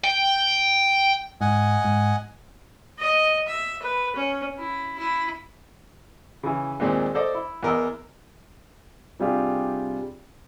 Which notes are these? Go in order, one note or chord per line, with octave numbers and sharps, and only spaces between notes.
G5
G#2 D#5 F#5 G#5
G#2
D#5
E5
B4
C#4
E4
E4
C#3 E3
D#2 A#2 G#3 C4
A4 C5 D5 D#5
E4
E2 A#4 D#5 E6
C3 G3 D4 F4 G4 G#4